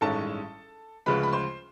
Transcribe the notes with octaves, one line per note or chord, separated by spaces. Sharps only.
A1 G2 D#3 G#3 C#4 A4 A5
D2 C#3 F3 G#3 B4 B5
B5
C5 C6